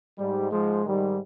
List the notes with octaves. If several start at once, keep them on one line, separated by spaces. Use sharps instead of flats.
G#2 G3
G#2 F3 G#3
G#2 D#3 G3